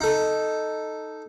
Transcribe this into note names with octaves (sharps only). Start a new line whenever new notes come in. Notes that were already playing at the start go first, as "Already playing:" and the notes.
D#4 A4